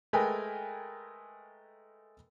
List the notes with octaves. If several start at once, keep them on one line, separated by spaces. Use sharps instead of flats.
G#3 A3 A#4 B4 G5 G#5